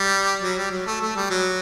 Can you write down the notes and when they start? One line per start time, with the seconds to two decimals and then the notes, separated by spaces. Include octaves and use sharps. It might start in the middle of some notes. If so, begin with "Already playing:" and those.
Already playing: G3
0.42 F#3
0.56 G3
0.71 F#3
0.86 A3
1.01 A3
1.16 G3
1.30 F#3